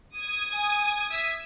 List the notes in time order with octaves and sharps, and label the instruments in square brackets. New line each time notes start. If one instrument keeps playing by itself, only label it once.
[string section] D#6 G#6
[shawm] G#5
E5